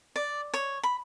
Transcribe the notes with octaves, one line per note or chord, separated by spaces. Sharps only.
D5
C#5
B5